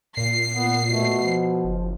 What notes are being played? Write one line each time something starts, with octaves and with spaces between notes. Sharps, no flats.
A#2 C7
B3
B2 A3
F3
F#1